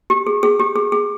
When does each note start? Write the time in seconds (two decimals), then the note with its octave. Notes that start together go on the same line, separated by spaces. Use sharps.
0.10 G4
0.27 G#4
0.43 G#4
0.60 G4
0.76 G#4
0.92 G#4